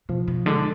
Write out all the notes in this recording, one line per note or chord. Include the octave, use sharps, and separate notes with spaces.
B2 F3
B2
D3 G#3